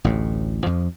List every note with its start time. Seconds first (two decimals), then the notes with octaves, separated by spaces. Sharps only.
0.04 A1 D2 A2
0.64 F2 F3